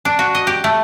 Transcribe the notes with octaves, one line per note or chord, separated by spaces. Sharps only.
D4
F#4
D#5
G4
A3